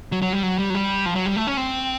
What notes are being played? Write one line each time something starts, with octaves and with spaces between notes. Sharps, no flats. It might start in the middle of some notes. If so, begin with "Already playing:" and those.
F#3
F#3
G3
F#3
G3
F#3
G3
F3
F#3
G3
A3
C#4
C4